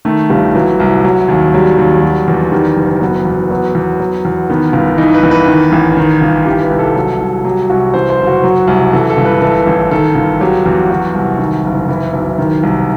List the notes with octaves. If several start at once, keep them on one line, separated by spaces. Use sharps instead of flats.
D#3 A3
G1 G3
E3 F#3
C2
F#3
D#2
F#3 G3
D#2
F#3
E2
D#3 G3
F#1
F#3 B3
E2
F#3 B3
E2
F#3
E2
D#3 B3
G1
E3 D#4
B4
E2
B4
D#3
A1
D#3
G1
E3 G4
B4
C2
A4
F#3
C2
F#3 G4
C2 F#4
E3 C5
C5
F#1
F#4
F#3
C2
E3 A4
A4
G1
B4
E3 A4
A1
D#3 A4
G1
F#3 G4
E2
F#3 F#4
C2
D#3
F#1
E3 E4
B1
D#3
C2